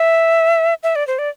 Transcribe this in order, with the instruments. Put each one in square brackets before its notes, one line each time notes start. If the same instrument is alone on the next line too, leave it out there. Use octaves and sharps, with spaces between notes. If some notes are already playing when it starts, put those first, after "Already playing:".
Already playing: [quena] E5
E5
D5
C5
D5